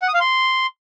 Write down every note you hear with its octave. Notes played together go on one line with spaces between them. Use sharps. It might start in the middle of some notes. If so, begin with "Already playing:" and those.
F#5
D#6
F5
C6